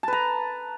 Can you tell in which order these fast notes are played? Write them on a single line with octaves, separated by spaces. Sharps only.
A5 B4 A#5